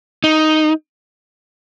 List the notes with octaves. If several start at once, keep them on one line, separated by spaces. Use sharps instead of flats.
D#4